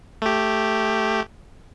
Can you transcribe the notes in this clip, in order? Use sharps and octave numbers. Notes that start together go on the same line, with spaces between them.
A3 G4